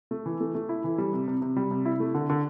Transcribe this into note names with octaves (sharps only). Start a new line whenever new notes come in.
A3
E3
A3
A3
E4
E3
G3
C3
C3
C3
G3
C3
E4
A3
D3
D3